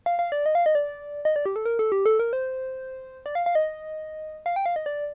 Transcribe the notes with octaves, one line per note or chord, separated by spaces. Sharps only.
F5
F5
D5
D#5
F5
D#5
D5
D#5
D5
G4
A4
A#4
A4
G4
A4
A#4
C5
D5
F5
F5
D#5
F5
G5
F5
D#5
D5